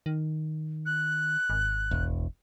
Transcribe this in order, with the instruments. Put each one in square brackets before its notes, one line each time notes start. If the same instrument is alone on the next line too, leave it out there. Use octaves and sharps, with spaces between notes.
[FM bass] D#3
[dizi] F#6
[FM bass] G#1
[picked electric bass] E1